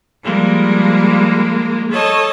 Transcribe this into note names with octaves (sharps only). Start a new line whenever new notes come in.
F3 G3 G#3 A#3
A4 C#5 D#5 A5